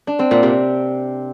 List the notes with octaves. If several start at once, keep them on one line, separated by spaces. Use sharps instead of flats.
D4
C4
A#2
C3